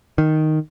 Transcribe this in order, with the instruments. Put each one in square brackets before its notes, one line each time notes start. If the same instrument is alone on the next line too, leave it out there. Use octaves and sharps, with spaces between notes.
[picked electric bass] D#3